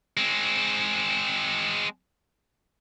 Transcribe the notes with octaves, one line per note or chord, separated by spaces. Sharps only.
G#3 C4